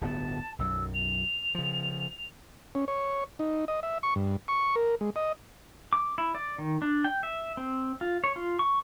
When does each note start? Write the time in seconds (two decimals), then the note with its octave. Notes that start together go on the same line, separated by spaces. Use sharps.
0.01 D1 G1 B3 A5
0.59 B1 F#2 E6
0.94 F7
1.55 C#3 F3
2.75 C#4
2.88 C#5
3.39 D#4
3.68 D#5
3.83 E5
4.03 C#6
4.16 G2
4.48 C#6
4.75 A#4
5.01 G#3
5.16 D#5
5.93 D6
6.18 E4
6.35 D5
6.58 D#3
6.82 D4
7.04 G5
7.23 E5
7.57 C4
8.01 F4
8.24 C#5
8.36 F4
8.59 C#6